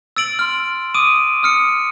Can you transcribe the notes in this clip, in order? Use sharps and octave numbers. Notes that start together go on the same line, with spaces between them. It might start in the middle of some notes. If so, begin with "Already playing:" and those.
E6 A6 D7 F#7
C6 F6
D6 D#6 D7 D#7
D#6 F6 C#7